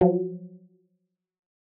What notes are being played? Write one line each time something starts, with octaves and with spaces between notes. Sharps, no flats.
F3 F#3